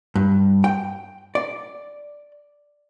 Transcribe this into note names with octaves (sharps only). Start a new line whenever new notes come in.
G2
G5
D5